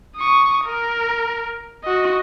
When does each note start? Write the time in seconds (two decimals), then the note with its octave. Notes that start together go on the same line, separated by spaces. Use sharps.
0.17 C#6 D#6
0.65 A#4
1.84 F#4 D#5